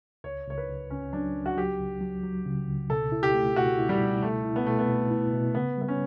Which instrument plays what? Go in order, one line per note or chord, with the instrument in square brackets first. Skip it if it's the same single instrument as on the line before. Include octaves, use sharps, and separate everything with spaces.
[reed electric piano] C#2 [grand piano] C#5
[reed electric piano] C#2 [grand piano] C#5
[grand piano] B4
[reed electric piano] C#2
[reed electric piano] C#2 [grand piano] C#4
[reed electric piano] F#3 [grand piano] D4
[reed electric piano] C#2
[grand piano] F#4
[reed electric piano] F#3 [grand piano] G4
[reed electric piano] C#2
F#3
F#3
C#3
C#2
[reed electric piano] B2 [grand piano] A4
[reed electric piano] E4
[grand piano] G4
[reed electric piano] A3
[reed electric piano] B2 [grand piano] F#4
[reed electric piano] E4
[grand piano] G3
[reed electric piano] B2
[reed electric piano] B2 [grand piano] A3
[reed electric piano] E4
[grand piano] B3
[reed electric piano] B2 [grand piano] A3
[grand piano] B3
[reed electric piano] B2
E4
B2
[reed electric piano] C#3 [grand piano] B3
[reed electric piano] G3 [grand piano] B3
[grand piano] C#4